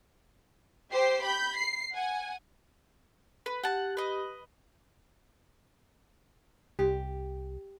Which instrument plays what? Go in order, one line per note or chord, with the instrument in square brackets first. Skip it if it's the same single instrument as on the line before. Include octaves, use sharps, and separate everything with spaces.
[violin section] G4 C5 C7
B5 G6
C7
F#5 G#5
[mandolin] B4
[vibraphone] G4 [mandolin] F#5 A5
[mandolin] B4 D#5
[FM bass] C2 [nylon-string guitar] G4